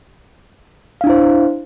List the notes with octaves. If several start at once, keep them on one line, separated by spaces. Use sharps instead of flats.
D4 E4 C5 F5